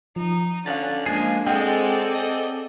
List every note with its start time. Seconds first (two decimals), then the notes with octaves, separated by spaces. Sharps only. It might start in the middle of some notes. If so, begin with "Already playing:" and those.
0.16 F3 D#4
0.66 D3 C#4 F5 F#6 A6
1.06 F3 G#3 A#3 D4 G#4
1.47 G#3 C4 G#4 A4 D5 F#5 G5
2.15 D#5